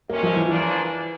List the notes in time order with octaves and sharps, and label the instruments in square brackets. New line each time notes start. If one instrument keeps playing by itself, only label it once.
[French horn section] C3 D#3 G#3 C#4 E4 [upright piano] A#3
[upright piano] F3
E3
[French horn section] C#3 F3 A#3 D4 [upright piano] E3